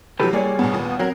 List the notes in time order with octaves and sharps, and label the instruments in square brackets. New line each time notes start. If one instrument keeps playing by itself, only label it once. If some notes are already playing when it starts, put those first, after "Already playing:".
[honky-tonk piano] C3 E3 F#3 [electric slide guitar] G4 A4 B4
[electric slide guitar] G3 G#4 C#5 [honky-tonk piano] A#3 D5
[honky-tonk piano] A1 G2 B2 [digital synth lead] B3
[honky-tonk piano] D#2 A#2 D#6
[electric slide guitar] F#3 [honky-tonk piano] C4 A#4